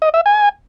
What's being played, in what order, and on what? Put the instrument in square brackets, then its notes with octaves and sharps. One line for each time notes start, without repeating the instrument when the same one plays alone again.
[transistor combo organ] D#5
E5
G#5